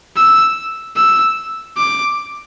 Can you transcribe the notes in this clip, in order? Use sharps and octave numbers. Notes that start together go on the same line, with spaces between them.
E6
E6
D6